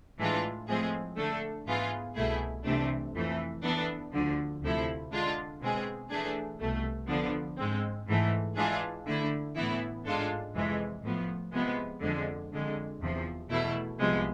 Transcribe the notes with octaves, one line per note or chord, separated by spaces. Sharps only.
A2 E3 G#3 D4 F4
A2 F3 G#3 C4 G#4
D3 A3 D4 A4
G#2 E3 B3 F4 G#4
C2 B2 A3 E4 G#4
C2 C3 E3 A3 D4
F2 E3 A3
E3 B3 D4 A4
D2 D3 F3
D2 C3 F3 A3 E4
D3 G#3 D4 F4
B2 G#3 C4 G#4
E3 A3 D4 G#4
C2 B2 A3
D3 F3 B3 D4
G#2 G#3 C4
G#2 E3 A3
E3 G#3 D4 F4 G#4
D3 A3 E4
A2 E3 B3 E4
G#2 G#3 D4 F4 A4
F2 C3 E3 G#3
A2 F3 B3
C3 F3 G#3 B3
F2 D3 F3 G#3
F2 D3 G#3
E2 C3 F3
E2 B2 A3 E4
C2 C3 F3 G#3 B3